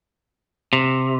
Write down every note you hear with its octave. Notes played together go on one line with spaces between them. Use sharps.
C3